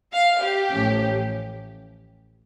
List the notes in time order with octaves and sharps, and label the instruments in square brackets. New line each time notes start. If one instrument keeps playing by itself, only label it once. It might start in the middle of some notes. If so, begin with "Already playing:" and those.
[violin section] F5
G4
[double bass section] A1 A2 F3 A3 C#4